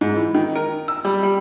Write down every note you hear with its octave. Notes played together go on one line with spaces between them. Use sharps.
G#2
E3
D#3
A#4
E6
G3
G3